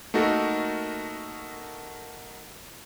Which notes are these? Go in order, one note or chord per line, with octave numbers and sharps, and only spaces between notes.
A3 A#3 D#4 F#4 A4 A#4